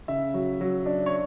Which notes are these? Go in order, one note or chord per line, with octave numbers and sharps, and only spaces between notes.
C#3 E5
F#3
F#3
D4
C#5